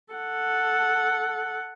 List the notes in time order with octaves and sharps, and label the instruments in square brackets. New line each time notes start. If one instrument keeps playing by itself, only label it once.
[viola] A4 F#5